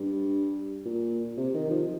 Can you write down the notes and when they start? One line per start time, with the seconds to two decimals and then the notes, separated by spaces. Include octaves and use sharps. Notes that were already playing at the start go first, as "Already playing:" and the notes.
Already playing: G2
0.85 A#2
1.37 C3
1.54 D#3
1.71 F3